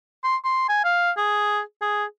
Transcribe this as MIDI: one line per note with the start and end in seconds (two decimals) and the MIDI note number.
0.24 0.36 84
0.44 0.64 84
0.69 0.82 80
0.85 1.11 77
1.18 1.60 68
1.82 2.04 68